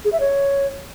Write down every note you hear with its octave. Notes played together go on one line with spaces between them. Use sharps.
G#4
E5
C#5